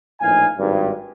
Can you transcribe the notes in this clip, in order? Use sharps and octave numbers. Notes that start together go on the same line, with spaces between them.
A#1 A2 E3 D#4 F5 G#5
G#1 G2